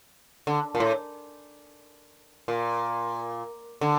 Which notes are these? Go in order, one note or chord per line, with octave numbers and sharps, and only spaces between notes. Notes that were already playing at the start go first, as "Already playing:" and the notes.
D3
A#2
A2
A#2
D3